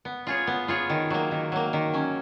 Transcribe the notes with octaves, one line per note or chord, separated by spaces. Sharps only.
B3
F4 G#4 C#5
B3
F4 G#4 C#5
D#3
F#3 A#3
D#3
F#3 A#3
D#3
F#3 C#4